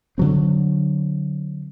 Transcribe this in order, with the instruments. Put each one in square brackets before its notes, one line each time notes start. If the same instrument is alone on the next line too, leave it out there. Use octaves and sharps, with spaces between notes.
[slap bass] D3 F#3 C4